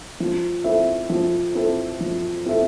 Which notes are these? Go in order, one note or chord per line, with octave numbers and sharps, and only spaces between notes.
F3
C4 E4 A4 E5
F3
C4 E4 A4 E5
F3
C4 E4 A4 E5